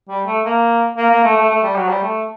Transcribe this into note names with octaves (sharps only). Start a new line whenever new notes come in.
G3
A3
A#3
A#3
A#3
A3
A3
A3
G3
F#3
G3
A3